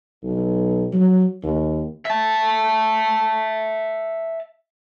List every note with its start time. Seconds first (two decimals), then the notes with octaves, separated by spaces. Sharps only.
0.24 B1
0.93 F#3
1.43 D#2
2.05 E5 A5